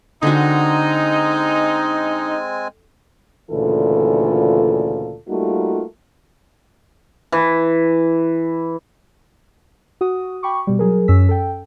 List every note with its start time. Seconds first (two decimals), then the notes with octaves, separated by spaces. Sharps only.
0.23 D3 G#3 C4 D#4 F#4 G#5
3.50 D2 A#2 C#3 E3 F4 A4
5.28 G3 A3 A#3 D#4 F4 F#4
7.32 E3
10.01 F#4 D#6
10.43 G5 B5 C#6 D6
10.67 B2 G3
10.79 F#3 G#4 A#4
11.08 F#2 C#4 E6 B6
11.29 A4 G5